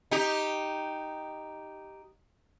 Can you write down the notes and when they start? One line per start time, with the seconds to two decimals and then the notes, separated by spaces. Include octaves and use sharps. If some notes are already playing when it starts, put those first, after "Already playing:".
0.11 D#4 G4